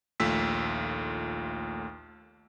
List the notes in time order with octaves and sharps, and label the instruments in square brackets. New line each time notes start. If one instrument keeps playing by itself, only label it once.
[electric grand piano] A#1 D#2 A3 F4 E6 B6